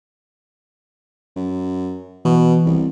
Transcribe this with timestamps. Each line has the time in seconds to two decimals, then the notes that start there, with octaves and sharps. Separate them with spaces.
1.36 F#2
2.25 B2 E3
2.66 C2